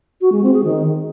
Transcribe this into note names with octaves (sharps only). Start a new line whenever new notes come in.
F#4
G#3
C4
G#4
D#3